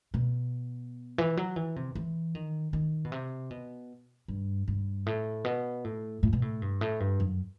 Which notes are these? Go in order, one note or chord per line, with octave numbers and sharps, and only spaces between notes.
B2
E3
F#3
E3
C3
E3
D#3
D#3
B2
C3
B2
G2
G2
A2
B2
A2
A2
B2
A2
G2
A2
G2
F#2